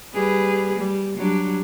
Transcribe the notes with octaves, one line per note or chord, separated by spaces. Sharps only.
G3 G#4 B4
G3
F#3 G3 D4